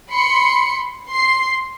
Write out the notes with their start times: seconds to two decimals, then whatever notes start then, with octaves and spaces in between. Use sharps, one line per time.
0.12 B5 C6 C#7
1.10 C6 C7